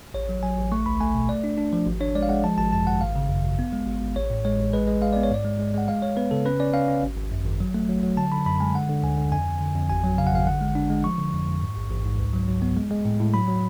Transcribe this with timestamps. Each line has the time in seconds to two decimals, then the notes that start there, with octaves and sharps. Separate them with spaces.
0.14 A1 C#5
0.29 F#3
0.43 F#3 G#5
0.57 A1
0.72 A3 C#6
0.86 C#2 B5
1.01 A3 G#5
1.14 B2
1.29 A3 D5
1.44 D4
1.58 D4
1.73 F3
1.86 G#1
2.00 D4 C#5
2.15 G#3 D5
2.23 F5
2.29 G#3 F#5
2.44 F3 A5
2.58 G#1 A5
2.73 F#2 A5
2.86 G#1 F#5
3.01 G#1 F5
3.16 C#3
3.29 F#2
3.44 G#1
3.59 B3
3.73 G#3
3.87 G#1
4.02 G#1
4.16 A1 C#5
4.30 A2
4.45 G#3 C#5
4.59 A1
4.73 G#3 B4
4.87 G#3
5.02 G#3 F5
5.13 B3 D5
5.23 C#5
5.30 G#2 D5
5.45 G#3
5.59 G#3
5.74 G#3 F#5
5.88 G#3 F5
6.02 G#3 C#5
6.17 B3 B4
6.31 C#3 A4
6.45 C#4 B4
6.60 C#4 D5
6.74 C#4 F5
6.88 C#4
7.03 G#1
7.17 G#1
7.32 F#2
7.46 G#1
7.60 F#3
7.74 A3
7.89 F#3
8.03 F#3
8.17 D3 A5
8.32 D3 B5
8.46 F#2 B5
8.60 G#3 G#5
8.75 D3 F#5
8.89 D3
9.03 D2 G#5
9.18 D3
9.32 F2 G#5
9.47 F2
9.61 D3
9.76 F2
9.89 G#1 G#5
10.04 F#3
10.18 C#3 F5
10.27 F#5
10.32 G#1 F5
10.47 D3 F#5
10.61 G#3
10.75 D4
10.90 G#3
11.04 F3 C#6
11.18 D3
11.33 F2
11.47 F2
11.61 G#2
11.76 A1
11.91 A1
12.05 G#2
12.19 C#2
12.34 F#3
12.48 F#3
12.62 B3
12.77 G#3
12.90 G#3
13.05 A2
13.20 A2
13.34 F#3 B5
13.48 F#3